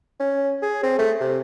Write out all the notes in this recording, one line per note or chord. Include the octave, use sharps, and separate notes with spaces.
C#4
G#4
C4
A3
C3